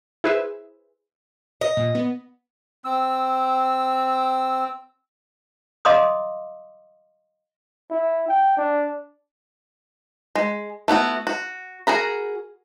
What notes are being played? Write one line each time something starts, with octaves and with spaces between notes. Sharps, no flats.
E4 G#4 B4 C5 E5
D#5
A#2
B3
C4 E6
D#5 F5 A#5 C6 D6 D#6
E4
G5
D4
G#3
A3 B3 E4 F#4
F#4
F#4 G#4 A#4 B5